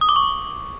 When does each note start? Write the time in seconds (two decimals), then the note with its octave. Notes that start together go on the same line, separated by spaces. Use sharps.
0.01 D#6
0.09 D6
0.16 C#6